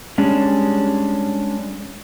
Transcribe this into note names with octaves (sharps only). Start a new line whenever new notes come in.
G3 G#3 C#4 D4